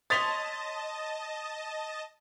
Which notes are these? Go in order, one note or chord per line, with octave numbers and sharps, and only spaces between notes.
C#5 D#5 A5 C6 D#6 A6 B6 F7